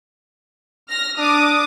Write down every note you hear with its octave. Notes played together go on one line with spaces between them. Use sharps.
F6 A#6
D4 D6 D#6